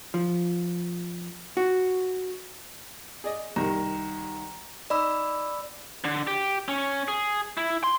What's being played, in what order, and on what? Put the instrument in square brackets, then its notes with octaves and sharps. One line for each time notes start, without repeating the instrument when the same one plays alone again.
[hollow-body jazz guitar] F3
F#4
[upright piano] G#4 D5 D#5
[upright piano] C2 D#3 [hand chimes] A#5
[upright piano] D#4 [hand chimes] D5 B5 E6
[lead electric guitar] D3
G4
C#4
G#4
E4
C6